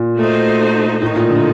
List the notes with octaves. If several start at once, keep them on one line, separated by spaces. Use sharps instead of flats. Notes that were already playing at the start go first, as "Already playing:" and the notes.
Already playing: A#2
A3 D#4 F#4 C5
A2 D#3 A3 D#4
A#2
D3